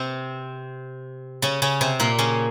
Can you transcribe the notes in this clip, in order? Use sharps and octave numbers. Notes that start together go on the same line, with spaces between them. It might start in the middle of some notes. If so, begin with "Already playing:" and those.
Already playing: C3 C4
C#3 C#4
C#3 C#4
C3 C4
A#2 A#3
C#3 C#4